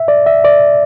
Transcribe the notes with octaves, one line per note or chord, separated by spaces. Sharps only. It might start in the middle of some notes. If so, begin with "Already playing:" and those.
Already playing: E5
D5
E5
D5